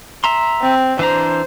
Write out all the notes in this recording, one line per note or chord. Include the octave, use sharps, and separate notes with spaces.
E5 A#5 C6
C4
E3 D4 C5 A#5